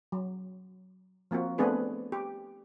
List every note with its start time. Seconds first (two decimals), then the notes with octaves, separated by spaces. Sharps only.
0.12 F#3
1.31 F3 A#3 C4 F#4
1.58 A3 B3 C4 D4 G#4 B4
2.12 G4